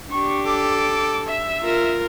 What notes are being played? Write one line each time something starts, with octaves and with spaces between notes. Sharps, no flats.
D4 G4 C#6
A4 D6
E5
F4 A#4